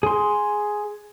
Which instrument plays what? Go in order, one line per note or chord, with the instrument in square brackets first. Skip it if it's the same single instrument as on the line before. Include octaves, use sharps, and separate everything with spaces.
[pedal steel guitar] G#4 C6